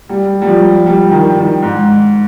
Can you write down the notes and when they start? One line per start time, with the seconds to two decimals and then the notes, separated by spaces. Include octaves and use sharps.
0.09 G3
0.42 G3
0.47 F3
0.86 G3
1.11 D#3
1.37 D#3
1.62 G#2